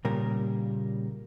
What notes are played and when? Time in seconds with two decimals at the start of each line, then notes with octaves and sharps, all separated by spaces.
0.05 A#2 C#3 G3 A#4